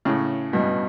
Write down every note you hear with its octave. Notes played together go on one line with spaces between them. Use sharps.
A2 C#3
G2 B2